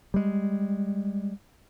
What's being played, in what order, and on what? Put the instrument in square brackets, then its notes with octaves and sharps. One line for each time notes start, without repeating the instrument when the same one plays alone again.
[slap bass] G3 G#3